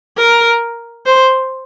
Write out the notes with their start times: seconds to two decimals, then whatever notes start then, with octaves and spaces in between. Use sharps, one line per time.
0.18 A#4
1.06 C5